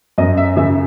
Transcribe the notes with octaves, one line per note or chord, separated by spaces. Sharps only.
F#2 D#5
E5
C#3 E5